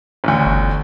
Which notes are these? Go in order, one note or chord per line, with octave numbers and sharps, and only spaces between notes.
A1 D2
G1